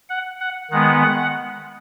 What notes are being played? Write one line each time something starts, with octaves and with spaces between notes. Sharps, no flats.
F#5
F#5
D#3 G#3 B3 F#5